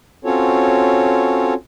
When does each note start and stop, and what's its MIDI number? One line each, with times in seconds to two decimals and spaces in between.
0.25 1.54 60
0.25 1.54 61
0.25 1.54 65
0.25 1.54 66
0.25 1.54 69
0.25 1.54 73